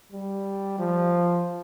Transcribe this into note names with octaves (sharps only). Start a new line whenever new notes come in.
G3
F3